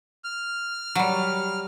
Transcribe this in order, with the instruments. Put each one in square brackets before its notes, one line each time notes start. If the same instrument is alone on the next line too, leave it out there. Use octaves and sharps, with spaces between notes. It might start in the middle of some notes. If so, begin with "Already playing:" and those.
[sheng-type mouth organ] F6
[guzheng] F#3 G3